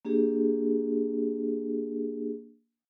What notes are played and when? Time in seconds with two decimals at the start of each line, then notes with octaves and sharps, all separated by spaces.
0.05 A#3 D4 G4 G#4